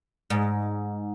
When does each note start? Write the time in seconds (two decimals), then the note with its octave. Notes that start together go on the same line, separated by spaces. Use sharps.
0.30 G#2